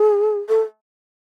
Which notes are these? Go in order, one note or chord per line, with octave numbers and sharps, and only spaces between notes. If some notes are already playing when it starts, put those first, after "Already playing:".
Already playing: G#4
A4